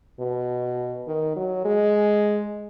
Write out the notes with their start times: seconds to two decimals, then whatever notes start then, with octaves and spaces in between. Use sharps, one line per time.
0.20 B2
1.07 D#3
1.36 F#3
1.65 G#3